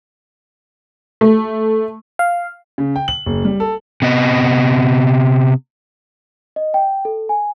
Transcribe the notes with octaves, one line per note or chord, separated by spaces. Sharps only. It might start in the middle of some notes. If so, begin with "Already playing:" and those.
A3
F5
C#3
G5
F#7
F#1
G3
A4
C3 B3 D#5
D#5
G5
A4
G#5